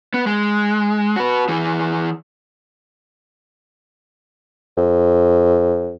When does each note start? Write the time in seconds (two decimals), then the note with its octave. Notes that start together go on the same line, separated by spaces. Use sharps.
0.14 B3
0.27 G#3
1.16 F#4 B4
1.49 E3 G#4
4.77 F2